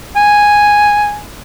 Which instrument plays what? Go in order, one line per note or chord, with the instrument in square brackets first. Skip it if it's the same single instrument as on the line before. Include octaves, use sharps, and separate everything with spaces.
[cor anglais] G#5